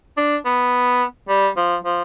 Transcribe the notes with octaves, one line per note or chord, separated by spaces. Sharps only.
D4
B3
G3
F3
F3